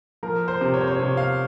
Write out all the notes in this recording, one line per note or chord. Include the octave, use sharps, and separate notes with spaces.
F3 A#4
C5
C3
C#5
C5
C#5
C3 C#5
F5